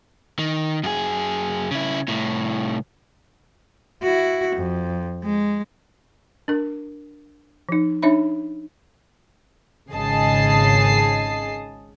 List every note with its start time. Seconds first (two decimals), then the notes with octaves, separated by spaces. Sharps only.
0.39 D#3
0.83 F#2 G#4
1.71 C#3 E4
2.08 C2 A2
4.02 E4 F#4
4.56 F2
5.24 G#3
6.48 D4 A#4
7.69 F3 D#4
8.02 D4 D#4 C#5 E5 B5
9.91 G#1 C#3 G#4 D#5 A5 C7